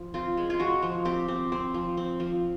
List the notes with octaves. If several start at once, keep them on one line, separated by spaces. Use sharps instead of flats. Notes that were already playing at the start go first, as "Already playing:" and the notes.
Already playing: F3
C4 F4
G#3
F4
G#3 F#4
F3
C4 G4
C4
C4
F3
C4
F3